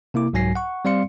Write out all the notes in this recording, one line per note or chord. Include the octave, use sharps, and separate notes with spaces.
C3 A#3 E4 D6
C2 G#2 F#3 G#5 A#6 C7
F#5 C#6
G3 C4 D5 F5 C6 C#7